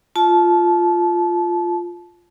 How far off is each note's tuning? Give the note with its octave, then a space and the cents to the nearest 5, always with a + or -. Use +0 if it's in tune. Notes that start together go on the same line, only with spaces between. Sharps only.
F4 +0 A5 -25